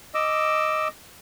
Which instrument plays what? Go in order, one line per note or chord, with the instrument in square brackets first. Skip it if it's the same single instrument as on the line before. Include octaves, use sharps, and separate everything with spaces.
[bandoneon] D#5 D6 E6